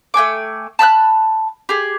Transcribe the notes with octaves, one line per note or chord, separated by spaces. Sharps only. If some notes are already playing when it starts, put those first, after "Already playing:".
A3 G5 G#5 D6
A5 B5 E6 F#6
G4 G#4